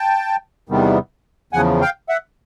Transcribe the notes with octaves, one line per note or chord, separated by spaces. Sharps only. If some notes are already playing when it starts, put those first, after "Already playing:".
Already playing: G5 A5
E2 C3 D#3 G3 B3
E2 C#3 F3 F#5 G#5
F5 G5
E5 F#5